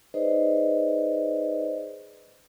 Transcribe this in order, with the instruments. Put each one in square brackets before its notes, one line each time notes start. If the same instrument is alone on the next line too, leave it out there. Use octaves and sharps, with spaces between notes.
[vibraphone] D#4 G#4 B4 C5 D5 D#5